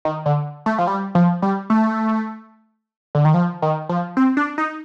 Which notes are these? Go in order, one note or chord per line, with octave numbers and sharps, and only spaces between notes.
D#3
D3
A3
F3
G3
F3
G3
A3
D3
D#3
F3
D#3
F3
C4
D4
D#4